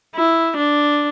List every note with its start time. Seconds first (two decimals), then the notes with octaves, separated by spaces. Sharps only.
0.16 E4
0.57 D4